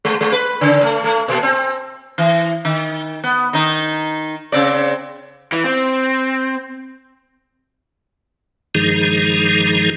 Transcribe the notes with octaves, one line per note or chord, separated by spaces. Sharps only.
G#3
G#3
B4
C#3
A3
A3
A#2
C4
E3
D#3
B3
D#3 D#4
C#3 C4 D5
E3
C4
G2 D#3 F3 G#3 D#4 G#4